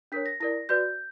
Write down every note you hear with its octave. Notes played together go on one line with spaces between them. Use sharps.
D4 A#4 C#5 B6
A#6
E4 A#4 D5 A#6
F#4 B4 D5 G6